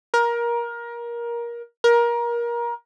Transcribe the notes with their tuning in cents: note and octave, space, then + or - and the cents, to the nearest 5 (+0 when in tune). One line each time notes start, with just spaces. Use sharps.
A#4 +20
A#4 +25